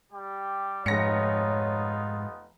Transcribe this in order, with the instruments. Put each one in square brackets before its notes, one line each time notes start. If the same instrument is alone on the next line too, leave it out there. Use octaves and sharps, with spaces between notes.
[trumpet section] G3 G4 G5
[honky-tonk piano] F1 A#6 C#7 [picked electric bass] G#2 [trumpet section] B3 D#4 F4 [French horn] C#5